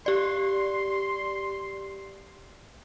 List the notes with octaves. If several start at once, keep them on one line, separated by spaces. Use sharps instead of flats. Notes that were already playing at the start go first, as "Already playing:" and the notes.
G4 D5 C6